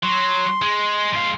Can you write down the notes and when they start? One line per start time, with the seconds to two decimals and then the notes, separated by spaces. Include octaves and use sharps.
0.03 F#3 C6
0.62 G#3
1.13 G#2 F5 C6